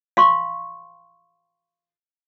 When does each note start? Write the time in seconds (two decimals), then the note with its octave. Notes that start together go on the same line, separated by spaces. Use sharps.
0.17 F5 C6 C#6